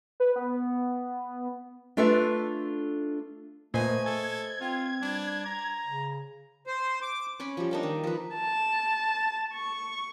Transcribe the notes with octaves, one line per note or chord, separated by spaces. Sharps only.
B4
B3
A3 D4 F4 A4 B4 E5
A#2 A3 B4 C5 D#5 G#5
A4 G#6
C4 F4
G3 D4
A#5
C#3
C5
D6
C#4 C#5 G#5 B5
F3 G3
A#3 D4 D#4
D#3
F3 B4
A5
C#6